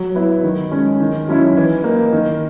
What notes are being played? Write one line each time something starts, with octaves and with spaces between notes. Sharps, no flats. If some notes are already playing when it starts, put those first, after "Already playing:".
Already playing: F#3
B3 E4
D#3
G#3 C#4
D#3
F#3 C#4 E4
E3
A#3 D#4
D#3